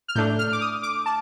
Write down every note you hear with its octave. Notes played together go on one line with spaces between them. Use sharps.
F6
A2 A3 D4 G6
F6
D6
D#6
D6
A5